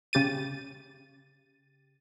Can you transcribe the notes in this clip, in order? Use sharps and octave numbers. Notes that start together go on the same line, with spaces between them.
C#3 G4 A6 D#7